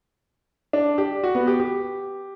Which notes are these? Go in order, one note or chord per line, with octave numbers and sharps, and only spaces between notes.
D4
G4
F#4
B3
G4
G4